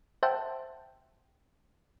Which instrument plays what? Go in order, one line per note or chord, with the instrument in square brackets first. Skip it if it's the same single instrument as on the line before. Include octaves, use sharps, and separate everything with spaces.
[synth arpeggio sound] C5 E5 F#5 G5 A5